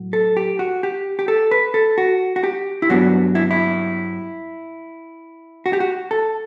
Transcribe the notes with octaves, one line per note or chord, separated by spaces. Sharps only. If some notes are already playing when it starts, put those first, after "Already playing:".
Already playing: A2 F#3
A4
G4
F#4
G4
G4
A4
B4
A4
F#4
F#4
G4
E4
G2 F#3 B3 D4 F#4
E4
E4
F#4
G4
F#4
A4